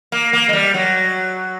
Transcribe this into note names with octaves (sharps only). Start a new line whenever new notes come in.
A#3
A#3
G#3
G3
F#3